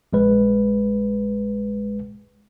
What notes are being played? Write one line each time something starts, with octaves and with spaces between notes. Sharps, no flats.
A#1 G#3 B4